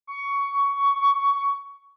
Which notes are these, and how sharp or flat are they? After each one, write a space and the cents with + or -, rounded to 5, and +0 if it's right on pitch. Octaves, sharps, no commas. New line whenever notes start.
C#6 +15